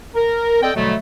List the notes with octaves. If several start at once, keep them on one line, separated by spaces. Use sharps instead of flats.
A#4
C4 A4 D5 D#5 G5
B2 D3 F#3 G3 A3